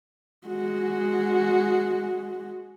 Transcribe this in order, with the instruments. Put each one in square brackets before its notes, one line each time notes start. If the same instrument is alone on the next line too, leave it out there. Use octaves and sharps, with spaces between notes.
[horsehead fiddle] G#3 F#4